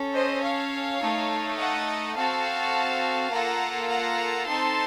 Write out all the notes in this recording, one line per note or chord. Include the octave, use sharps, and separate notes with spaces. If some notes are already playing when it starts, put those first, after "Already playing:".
Already playing: C#4 A4
C5 D#5
C#5 F5
A3 D#4 A4
D#5 F#5
C4 F#4 A4 F5 A5
A#3 F4 A4 F#5 A#5
F#5 A#5
C4 D#4 A4 A5 C6